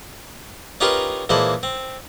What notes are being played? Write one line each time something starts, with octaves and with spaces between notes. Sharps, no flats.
C#4 D#4 F4 G4 A#4 B4
A#2 E3 G#3 C5 A5 B5
C4